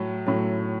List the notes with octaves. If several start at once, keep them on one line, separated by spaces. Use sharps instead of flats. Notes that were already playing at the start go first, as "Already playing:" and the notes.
Already playing: A2 F#3
A2 F#3